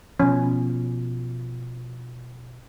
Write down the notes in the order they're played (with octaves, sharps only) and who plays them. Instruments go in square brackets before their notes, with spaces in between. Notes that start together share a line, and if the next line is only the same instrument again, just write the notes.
[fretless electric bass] B2 F3 [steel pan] C#4